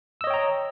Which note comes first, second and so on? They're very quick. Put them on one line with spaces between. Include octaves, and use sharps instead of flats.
E6 D#5 C#5 G5 A#5